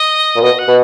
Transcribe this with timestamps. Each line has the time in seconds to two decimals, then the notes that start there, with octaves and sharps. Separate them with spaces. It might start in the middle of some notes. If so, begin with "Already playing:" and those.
Already playing: D#5
0.36 A#2
0.42 B2 D#5
0.59 F#5
0.68 B2